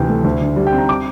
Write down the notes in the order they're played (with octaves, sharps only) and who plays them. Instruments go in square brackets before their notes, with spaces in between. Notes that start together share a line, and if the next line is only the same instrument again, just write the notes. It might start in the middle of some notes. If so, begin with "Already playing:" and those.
Already playing: [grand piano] D2 C3 E3 G5
A3
D2
D3
G3
G5
C4
A#5
D6